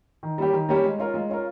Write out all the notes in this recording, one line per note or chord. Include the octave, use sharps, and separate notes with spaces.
D#3
G3 A#3 C#4 G4
D#3
G3 A#3 C#4 G4
G#3
C#4 F4 A#4
G#3
C#4 F4 A#4